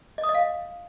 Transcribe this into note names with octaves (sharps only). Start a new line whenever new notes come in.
D#5
D#6
D#5
F5